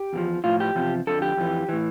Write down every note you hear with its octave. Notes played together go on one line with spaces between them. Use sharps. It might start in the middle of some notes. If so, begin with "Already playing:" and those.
Already playing: G4
E2 D3 F3
A2 F3 F4
G4
E2 C3 F3
F2 D3 F3 A4
G4
F2 E3
A2 E3